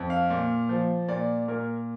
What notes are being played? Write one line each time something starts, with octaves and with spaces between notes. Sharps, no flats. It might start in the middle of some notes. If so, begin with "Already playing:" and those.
Already playing: F2
F5
A#2
F3
A#2 D5
A#2 A#4